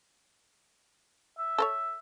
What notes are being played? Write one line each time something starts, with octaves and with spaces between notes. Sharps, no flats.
E5
A4 C5 C#5